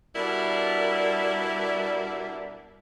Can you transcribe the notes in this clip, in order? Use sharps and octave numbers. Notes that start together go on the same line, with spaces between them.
B2 G3 D4 E4 A#4 D5